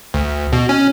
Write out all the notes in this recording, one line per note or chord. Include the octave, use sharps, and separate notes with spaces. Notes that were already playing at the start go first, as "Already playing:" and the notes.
D2
B2
C#4